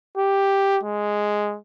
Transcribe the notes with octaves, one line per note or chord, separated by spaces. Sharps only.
G4
G#3